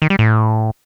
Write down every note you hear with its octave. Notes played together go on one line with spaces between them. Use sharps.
D#3
G3
A2